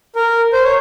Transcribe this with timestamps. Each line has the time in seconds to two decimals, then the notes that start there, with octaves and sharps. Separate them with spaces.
0.15 A#4
0.53 C5
0.63 C#5